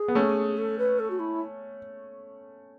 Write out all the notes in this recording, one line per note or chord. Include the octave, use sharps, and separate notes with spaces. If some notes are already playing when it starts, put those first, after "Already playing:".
Already playing: G#4
B3
A3 C#4
A4
B4
A4
F#4
E4